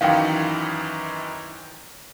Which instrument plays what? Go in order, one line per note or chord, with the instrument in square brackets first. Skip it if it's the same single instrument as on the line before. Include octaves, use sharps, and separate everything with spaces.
[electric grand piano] F#2 D#3 E3 [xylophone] F5 G5